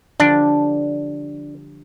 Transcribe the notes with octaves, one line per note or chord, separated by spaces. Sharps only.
D3 F3 G3 D4